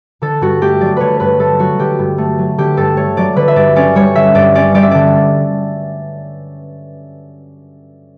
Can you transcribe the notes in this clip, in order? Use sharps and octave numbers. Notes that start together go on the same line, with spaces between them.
D3 A4
G2 F#4
A3 G4
F#3 D5
D3 B4 C#5
G2 B4
A3 A4
F#3 F#4
D3 G4
G2
A3
F#3
D3 G4
G2 A4
A3 C#5
F#3 D5
D3 B4
E5
G2 D5
C#4 D5
G3 C#5
D3 E5
G2 D5
C#4 D5
G3 D5
E5
D3 D5